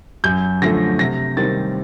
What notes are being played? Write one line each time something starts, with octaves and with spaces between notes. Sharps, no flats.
F#2 G6
D3 F3 A3 A#6
C3 A#6
D#3 G3 C4 A6